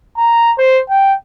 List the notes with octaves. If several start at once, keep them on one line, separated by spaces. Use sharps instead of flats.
A#5
C5
G5